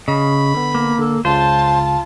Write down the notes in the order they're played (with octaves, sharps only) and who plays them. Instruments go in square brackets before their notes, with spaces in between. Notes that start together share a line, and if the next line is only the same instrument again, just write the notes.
[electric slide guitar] C#3 [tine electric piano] D#5 [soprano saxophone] B5
[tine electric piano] D3 B3
[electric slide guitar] A#3
[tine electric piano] D3 [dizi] A4
[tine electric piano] C#2 C#3 [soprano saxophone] F4 [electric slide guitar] C5 [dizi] A5